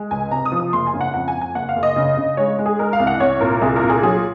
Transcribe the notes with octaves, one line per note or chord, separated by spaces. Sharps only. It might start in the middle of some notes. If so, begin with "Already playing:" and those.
Already playing: G#3
C#2 G#5
C3 A#5
D#6
F3
D#6
F#1 C6
G#5
C#3
F#5
F2 F#5
G#5
F2
G#5
F#1 F#5
F5
F#1
D#5
C#3
C#3
G#3 C#5
G#3
G#4
G#3 A#4
F5
C2
F#5
C2 C#5
A#2 A#4
C2 G#4
A#4
A#2
G#4
F#3 G#4